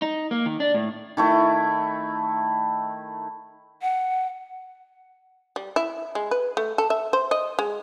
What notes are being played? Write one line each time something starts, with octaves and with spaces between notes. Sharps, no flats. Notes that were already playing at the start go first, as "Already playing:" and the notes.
D#4
A#3
D#3
D4
A2
D#3 A3 E4
F#5
G3
E4
G#3
B4
A3
A4
E5
C5
D#5
G#3